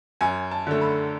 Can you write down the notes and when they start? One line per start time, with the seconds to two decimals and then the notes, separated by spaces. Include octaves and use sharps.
0.21 F#2 G#5
0.51 A5
0.67 D3 A3
0.81 B5